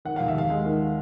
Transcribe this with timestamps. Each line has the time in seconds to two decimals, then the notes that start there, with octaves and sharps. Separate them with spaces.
0.05 D#3 F#5
0.16 D#2 F5
0.28 E5
0.35 D#2 F5
0.50 G#3
0.65 D#3